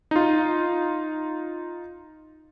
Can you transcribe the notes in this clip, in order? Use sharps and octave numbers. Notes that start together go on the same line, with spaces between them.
D#4 F4